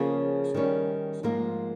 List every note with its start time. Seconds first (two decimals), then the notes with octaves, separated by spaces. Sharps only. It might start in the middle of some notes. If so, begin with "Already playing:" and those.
Already playing: C#3 F3 A#3 C#4 G#4
0.54 D#3 G3 C#4
1.23 G#2 F3 A#3 F4 A#4